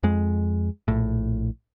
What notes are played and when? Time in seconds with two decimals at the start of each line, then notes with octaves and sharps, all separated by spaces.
0.03 F2 G#3
0.88 A#1 A2